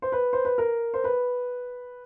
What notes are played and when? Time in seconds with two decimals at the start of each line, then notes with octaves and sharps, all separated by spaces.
0.02 C5
0.12 B4
0.33 C5
0.45 B4
0.58 A#4
0.94 C5
1.04 B4